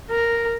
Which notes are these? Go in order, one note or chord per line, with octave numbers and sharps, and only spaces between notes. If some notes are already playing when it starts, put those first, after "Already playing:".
A#4